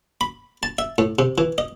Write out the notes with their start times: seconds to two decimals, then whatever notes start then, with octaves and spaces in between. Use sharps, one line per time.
0.21 B5
0.63 A5
0.79 E5
0.98 A2
1.19 C3
1.38 E3
1.58 D#5